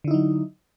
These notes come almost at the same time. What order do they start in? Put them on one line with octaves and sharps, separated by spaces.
D3 E4 D#4 F#3